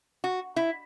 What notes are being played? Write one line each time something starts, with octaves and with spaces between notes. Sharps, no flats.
F#4
E4